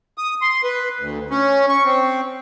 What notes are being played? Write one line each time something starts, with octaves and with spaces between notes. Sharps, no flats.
D#6
C6
B4
D2
C#4
C#6
C4